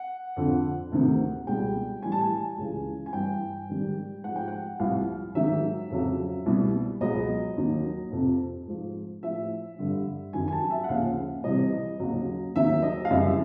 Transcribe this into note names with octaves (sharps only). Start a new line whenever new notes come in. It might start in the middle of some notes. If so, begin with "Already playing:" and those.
Already playing: F#5
F2 D3 F3
D2 C3 D#3
C#2 B2 G3 G5
A2 E3 G3 G#5
A5
G#5
C#2 C#3 E3
G#5
G2 E3 G3 G5
G#2 D#3 G3
G#2 F3 F#5
G5
F#5
C2 C3 F3 F5
G#2 D#3 F#3 E5
F2 C#3 F#3
C2 B2 G3
C#2 B2 F#3 D#5
D#2 D#3 F#3
F2 C3 F3
G#2 F3
A2 F3 E5
G2 D3 G3
F#2 D#3 F#3 G#5
G#5
A5
E5
F#5
D#2 C#3 F3 F5
C2 C3 E3 G3 D#5
D#2 C#3 F#3
D#2 D#3 F#3 E5
D#5
F5
F#2 C#3 E3 G3 E5